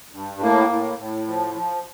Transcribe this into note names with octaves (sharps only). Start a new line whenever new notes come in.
G2
A2 A#3
A2
A2
F3
F3